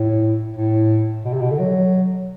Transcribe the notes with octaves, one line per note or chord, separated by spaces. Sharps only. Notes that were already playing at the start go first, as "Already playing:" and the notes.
Already playing: A2
A2
B2
C3
B2
D3
F#3